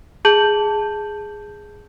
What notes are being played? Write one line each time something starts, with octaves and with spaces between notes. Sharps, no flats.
G#4 A5 G6 F#7